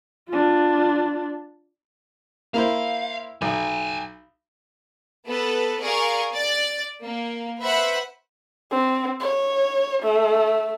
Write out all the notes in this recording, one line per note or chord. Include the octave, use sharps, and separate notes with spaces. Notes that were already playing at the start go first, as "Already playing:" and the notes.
D4 F4
A#3 E4 C5 F5
B1 G5 G#5
B3 A4 B4
G#4 A#4 D5 F5 G#5 C#6
D5 A6
A#3
B4 C5 E5 F#5 B5
C4
C#5
A3